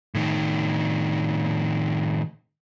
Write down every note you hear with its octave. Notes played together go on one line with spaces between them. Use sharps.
A2 D#3